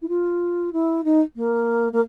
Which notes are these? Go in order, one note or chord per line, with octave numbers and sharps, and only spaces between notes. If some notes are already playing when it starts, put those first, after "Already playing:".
E4
F4
E4
D#4
A#3
A#3